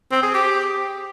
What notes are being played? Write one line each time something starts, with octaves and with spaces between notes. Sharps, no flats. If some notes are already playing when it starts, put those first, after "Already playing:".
C4
G#4
G4